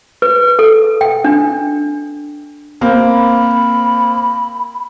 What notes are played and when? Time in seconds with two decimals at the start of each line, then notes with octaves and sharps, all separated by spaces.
0.22 B4
0.59 A4
1.01 G5
1.24 D4
2.81 A#3 C4 B5